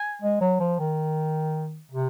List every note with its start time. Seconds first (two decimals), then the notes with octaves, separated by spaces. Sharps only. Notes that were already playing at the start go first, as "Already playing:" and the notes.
Already playing: G#5
0.22 G#3
0.41 F#3
0.60 F3
0.79 D#3
1.91 C3